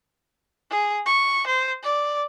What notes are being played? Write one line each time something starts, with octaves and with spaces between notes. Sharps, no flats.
G#4
C#6
C5
D5